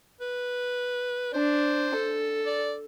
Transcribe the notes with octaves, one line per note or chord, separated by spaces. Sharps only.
B4
D4 C5
A4
D5